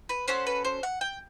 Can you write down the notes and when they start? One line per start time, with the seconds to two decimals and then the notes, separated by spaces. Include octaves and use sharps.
0.09 B4
0.28 C#4 F#4 A4 C5
0.47 B4
0.65 C5
0.83 F#5
1.01 G5